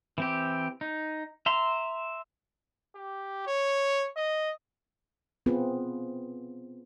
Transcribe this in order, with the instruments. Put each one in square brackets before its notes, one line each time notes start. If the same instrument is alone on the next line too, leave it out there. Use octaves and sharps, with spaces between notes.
[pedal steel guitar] E3 C4 G4
D#4
E5 A#5 C6
[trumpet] G4
C#5
D#5
[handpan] B3 C4 F4 G#4 B4